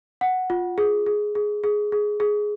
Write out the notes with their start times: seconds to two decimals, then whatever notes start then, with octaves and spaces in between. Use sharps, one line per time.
0.21 F#5
0.50 F4
0.78 G#4
1.06 G#4
1.35 G#4
1.64 G#4
1.92 G#4
2.20 G#4